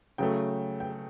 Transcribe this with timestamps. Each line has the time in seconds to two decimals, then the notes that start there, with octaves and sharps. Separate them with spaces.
0.18 C#3 F#3 A3 G5
0.80 G5